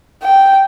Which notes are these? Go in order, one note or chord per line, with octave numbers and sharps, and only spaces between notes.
G5